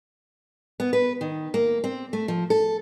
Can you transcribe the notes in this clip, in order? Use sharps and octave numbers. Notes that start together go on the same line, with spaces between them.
B3
B4
D#3
A#3
C4
A3
F3
A4